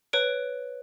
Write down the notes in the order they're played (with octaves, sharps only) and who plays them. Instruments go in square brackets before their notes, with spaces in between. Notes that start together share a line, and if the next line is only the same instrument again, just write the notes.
[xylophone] B4 C#5 D7